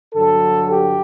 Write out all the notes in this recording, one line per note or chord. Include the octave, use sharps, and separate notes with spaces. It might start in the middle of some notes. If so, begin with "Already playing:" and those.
G2 D3 F#3 A4
G4